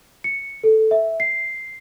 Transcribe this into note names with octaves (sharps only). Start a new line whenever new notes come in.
C#7
A4
E5
C7